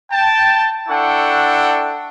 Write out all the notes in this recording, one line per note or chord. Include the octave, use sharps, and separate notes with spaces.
G5 A5
D4 E4 A4 F#5 G5 C#6